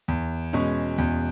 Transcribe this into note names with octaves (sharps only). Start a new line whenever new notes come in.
E2
B2 G#3 C#4
E2